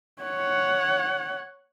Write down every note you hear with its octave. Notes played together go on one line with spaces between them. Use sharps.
C#5 F#5